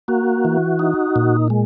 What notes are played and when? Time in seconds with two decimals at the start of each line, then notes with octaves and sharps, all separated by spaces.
0.08 A#3 F#4
0.45 E3
0.79 D#4
1.16 A#2
1.50 G#3